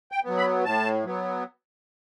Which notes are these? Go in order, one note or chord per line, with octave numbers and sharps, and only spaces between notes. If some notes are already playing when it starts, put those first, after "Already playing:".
G5
F#3 B3
B5
A2 A5
F#3 B3